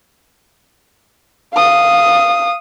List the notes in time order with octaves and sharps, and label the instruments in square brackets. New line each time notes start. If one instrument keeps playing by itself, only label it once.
[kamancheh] F5 D#6